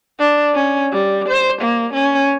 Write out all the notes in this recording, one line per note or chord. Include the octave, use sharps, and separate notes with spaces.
D4
C#4
G3
C5
A#3
C#4